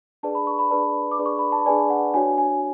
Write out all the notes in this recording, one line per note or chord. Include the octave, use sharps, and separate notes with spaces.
D4 G#4 B4 D5 A5
B5
C#6
B5
D4 G#4 B4 D5 A5
D6
D4 G#4 B4 D5
C#6
B5
A5
D4 G#4 B4 D5 G#5
F#5
D4 F#4 C#5 G#5
G#5